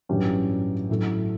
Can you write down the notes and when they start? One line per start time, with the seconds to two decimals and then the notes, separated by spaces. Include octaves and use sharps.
0.09 A1 G2 F#3 C#4 G4
0.90 A2 F#3 A3